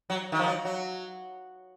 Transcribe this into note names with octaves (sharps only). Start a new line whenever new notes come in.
F#3
D#3
F3
F#3
F#3